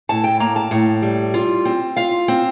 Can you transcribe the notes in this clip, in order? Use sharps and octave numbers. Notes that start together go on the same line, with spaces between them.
A2 A5
G5
A#3 A#5
A5
A2
G3
F4
C4
F4 F5
C4